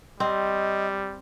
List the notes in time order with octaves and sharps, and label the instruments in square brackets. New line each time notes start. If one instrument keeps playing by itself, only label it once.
[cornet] G3 [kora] C4 [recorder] D#5